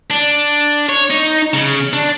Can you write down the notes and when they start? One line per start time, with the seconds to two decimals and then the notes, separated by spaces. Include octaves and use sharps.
0.11 D4
0.89 C#5
1.10 D#4
1.54 C#3
1.93 D4